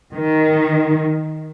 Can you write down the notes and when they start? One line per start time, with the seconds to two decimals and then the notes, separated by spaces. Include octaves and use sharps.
0.15 D#3